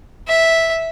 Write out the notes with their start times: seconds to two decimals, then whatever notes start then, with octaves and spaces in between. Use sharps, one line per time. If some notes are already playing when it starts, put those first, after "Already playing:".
0.28 E5